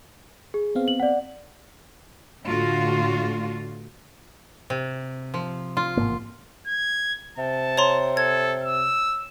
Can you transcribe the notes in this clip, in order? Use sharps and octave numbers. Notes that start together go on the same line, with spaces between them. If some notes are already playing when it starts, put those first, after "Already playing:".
G#4
B3 C4 F5
F#7
D5 F#5
A2 D3 A3 F4 F#4
C3
F3
F4
A1 G#2 A#3
G#6
C3 A5
C#5 A#5 C6
A4 G#6
E6